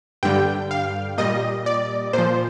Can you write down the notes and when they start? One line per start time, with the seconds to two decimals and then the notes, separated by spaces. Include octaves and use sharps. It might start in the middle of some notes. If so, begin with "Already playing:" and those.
0.23 G2 D3 G3 G5
0.71 F5
1.18 A#2 G3 D#5
1.66 D5
2.13 A#2 F3 C5